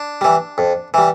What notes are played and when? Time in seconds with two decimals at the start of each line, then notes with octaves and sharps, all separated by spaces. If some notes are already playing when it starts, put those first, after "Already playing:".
Already playing: D4
0.21 E3 G3
0.58 F2
0.94 E3 G3